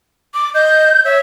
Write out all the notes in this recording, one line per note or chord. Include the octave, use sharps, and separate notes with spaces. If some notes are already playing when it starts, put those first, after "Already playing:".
D6
D#5 G6
C#5 E5